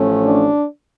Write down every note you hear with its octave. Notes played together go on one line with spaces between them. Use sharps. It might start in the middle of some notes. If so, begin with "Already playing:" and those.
Already playing: A1 A2 F3 A3 C#4
D4